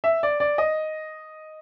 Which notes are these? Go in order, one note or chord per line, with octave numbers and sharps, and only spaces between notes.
E5
D5
D5
D#5